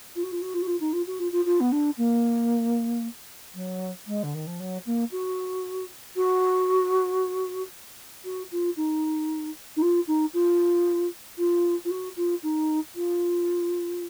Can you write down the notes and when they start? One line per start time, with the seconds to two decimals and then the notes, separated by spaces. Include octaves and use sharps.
0.16 F4
0.23 F#4
0.32 F4
0.42 F#4
0.54 F4
0.62 F#4
0.67 F4
0.80 D#4
0.93 F4
1.07 F#4
1.19 F4
1.32 F4
1.45 F4
1.60 B3
1.72 D4
1.98 A#3
3.55 F#3
4.07 G#3
4.23 D3
4.34 D#3
4.47 F3
4.60 F#3
4.86 A#3
5.12 F#4
6.17 F#4
8.25 F#4
8.52 F4
8.77 D#4
9.76 D#4
9.82 F4
10.07 D#4
10.34 F4
11.38 F4
11.85 F4
11.91 F#4
12.17 F4
12.43 D#4
12.96 F4